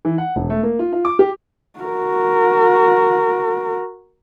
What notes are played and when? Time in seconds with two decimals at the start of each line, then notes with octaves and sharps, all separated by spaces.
0.05 E3
0.18 F#5
0.36 E1
0.50 A3
0.63 A#3
0.79 F4
0.93 F4
1.05 D6
1.19 G4
1.80 F#4 A#4